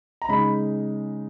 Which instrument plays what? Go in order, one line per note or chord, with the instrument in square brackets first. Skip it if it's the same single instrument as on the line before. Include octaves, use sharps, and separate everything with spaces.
[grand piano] A#5
C#3 G#3 D#4 B5